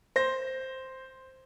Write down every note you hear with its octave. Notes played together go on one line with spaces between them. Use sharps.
C5 A#6